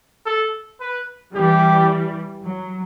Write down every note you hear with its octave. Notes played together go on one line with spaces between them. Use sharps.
A4
B4
E3 G3 G4
F#3